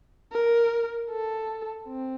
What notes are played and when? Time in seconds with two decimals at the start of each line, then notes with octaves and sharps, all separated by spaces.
0.32 A#4
1.10 A4
1.87 C4